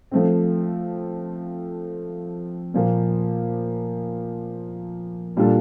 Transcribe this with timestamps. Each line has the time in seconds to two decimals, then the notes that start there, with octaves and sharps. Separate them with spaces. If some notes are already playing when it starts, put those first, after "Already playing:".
0.11 F3 A3 C4
2.74 A#2 F3 A#3
5.37 A#2 G3 D4 F4 A4